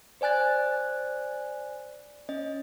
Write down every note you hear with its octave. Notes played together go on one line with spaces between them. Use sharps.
C5 D5 G#5 F#6 A6
C#4 D#5